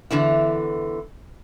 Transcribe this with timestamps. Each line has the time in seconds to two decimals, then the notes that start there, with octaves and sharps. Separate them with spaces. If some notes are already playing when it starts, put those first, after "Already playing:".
0.11 E2 D3 E3 E4